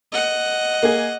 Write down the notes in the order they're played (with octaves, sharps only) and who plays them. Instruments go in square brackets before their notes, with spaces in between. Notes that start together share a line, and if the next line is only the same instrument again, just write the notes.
[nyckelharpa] D#5 F#5
[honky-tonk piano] A#3 G#4